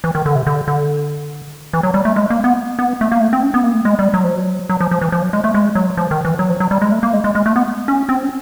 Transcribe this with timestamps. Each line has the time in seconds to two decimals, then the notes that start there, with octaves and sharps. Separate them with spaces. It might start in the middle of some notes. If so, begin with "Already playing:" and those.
0.04 E3
0.15 D#3
0.26 D3
0.36 C3
0.47 D3
0.68 D3
1.73 E3
1.83 F#3
1.94 G3
2.05 A3
2.16 G#3
2.30 A#3
2.44 B3
2.79 B3
3.01 A3
3.12 A#3
3.21 A3
3.33 C4
3.43 C#4
3.54 B3
3.64 A#3
3.74 A3
3.85 G#3
3.99 G3
4.14 F#3
4.24 F3
4.36 F#3
4.69 F#3
4.80 F3
4.91 F3
5.01 E3
5.12 F3
5.22 F#3
5.33 G#3
5.44 A3
5.54 G#3
5.75 F#3
5.97 F3
6.11 D#3
6.25 E3
6.39 F#3
6.49 F3
6.60 F#3
6.71 G3
6.82 G#3
6.92 A3
7.03 A#3
7.13 G#3
7.24 G#3
7.35 G#3
7.46 A3
7.56 B3
7.88 C#4
8.09 C4
8.23 C#4